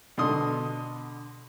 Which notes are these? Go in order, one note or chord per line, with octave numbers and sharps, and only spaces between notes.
B2 D3 C6 D#6